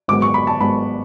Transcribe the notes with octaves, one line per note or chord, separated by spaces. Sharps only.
G#1 G#2 F#3 B3 D6
C#6
B5
A5
G#1 G#2 F#3 B3 B5